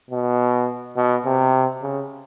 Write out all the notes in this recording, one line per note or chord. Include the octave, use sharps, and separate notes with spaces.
B2
B2
C3
C#3